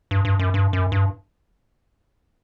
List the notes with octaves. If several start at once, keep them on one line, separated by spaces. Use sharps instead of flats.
G2
G2
F#2
G2
F#2
G2